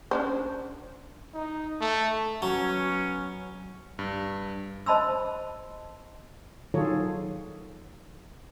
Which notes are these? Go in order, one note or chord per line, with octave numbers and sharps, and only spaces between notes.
C#4 D4 C5
D#4
A3
F#3 B3 C#4
G2
C5 D#5 A5 B5 C6 E6
D#3 F#3 F4 G#4 A4 C#5